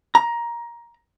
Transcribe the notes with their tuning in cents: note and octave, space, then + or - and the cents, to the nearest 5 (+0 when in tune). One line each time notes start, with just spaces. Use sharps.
A#5 +15